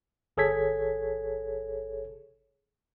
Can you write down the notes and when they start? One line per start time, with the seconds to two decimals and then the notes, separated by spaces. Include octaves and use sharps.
0.37 G1 G#4 A4 C#5 G#6 B6